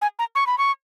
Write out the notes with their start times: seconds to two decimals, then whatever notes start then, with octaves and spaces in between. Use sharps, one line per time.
0.01 G#5
0.19 A#5
0.35 C#6
0.47 B5
0.58 C#6